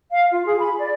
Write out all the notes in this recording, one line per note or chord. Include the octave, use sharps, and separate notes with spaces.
F5
F4
G#4
B5
D5